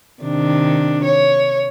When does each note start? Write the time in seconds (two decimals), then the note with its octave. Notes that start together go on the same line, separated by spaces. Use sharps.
0.22 C3 D#3 D4
1.04 C#5